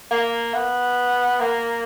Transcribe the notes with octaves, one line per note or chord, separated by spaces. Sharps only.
A#3
B3
A#3